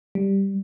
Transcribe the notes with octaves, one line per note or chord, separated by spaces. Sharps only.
G3